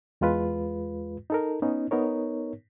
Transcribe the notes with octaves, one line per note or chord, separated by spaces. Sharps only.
E2 G#3 F4 B4
D#4 A4 A#4
B3 C#4 D#4
B3 D#4 A#4 C#5